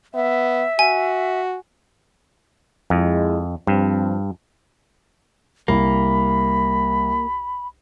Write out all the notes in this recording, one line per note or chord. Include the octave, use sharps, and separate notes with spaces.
B3 E5
F#4 G#5
F2 G#3 E4
G2 F3 C4
C2 A#3 B5